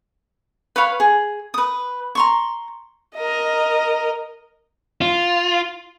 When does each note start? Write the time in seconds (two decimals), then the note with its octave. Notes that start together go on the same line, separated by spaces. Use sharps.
0.76 B4 C#5 F5 B5
1.00 G#4
1.54 B4 D#6
2.15 A#5 C6 C#6
3.16 A#4 D#5
5.01 F4